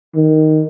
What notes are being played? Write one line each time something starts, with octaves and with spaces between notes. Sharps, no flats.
D#3